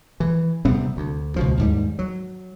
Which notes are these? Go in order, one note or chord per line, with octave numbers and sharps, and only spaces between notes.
E3
C3 G3 B3 C4
D2
C#2 B2 F3
D#2 G#2 G3
F#3